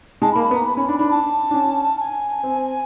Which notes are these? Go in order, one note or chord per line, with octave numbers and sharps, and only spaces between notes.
G#3 A5
B5
A#3
B5
B3
A#5
B5
C#4 B5
D4 B5
D4 B5
A5
D4
C#4
G#5
C4